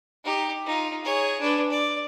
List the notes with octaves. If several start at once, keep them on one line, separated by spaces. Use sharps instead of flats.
D#4 G4
D#4 F4
G#4 C#5
D4 B4
D5